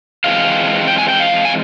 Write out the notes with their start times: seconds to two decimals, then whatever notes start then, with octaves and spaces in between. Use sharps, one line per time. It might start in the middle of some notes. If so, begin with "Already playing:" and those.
0.24 E3 G#3 C4 F4 F5
0.88 G5
0.98 G#5
1.09 G5
1.20 F5
1.45 G#5